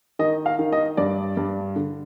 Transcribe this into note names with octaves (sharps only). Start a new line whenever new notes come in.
D#3 D#5
F5
D#3
D#5
G2 D5
G2
D3